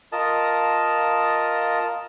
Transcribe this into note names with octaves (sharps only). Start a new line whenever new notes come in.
F4 A#4 D#5 A5